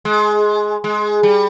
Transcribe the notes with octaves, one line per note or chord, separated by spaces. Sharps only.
G#3
G#3
G3